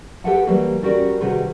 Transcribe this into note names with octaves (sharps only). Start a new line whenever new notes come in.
G4 A4 B4 E5 F#5 A5
E3 F#3 G3 A#3
G3 C#4 F#4 G4 A#4 D5
C3 D#3 G3 F#4 G#4 B4